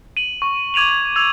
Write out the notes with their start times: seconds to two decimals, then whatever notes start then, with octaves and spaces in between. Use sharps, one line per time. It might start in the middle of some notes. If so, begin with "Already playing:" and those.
0.17 D#7 F#7
0.42 C#6
0.74 D6 G#6 D#7 F7 F#7
0.89 G#6
1.16 E6 G#6 F7